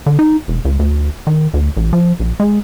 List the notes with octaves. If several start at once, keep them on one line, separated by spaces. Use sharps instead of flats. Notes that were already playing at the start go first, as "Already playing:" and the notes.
D3
D#4
E1
C#2
D2
D#3
D2
A1
F3
A#1
G#3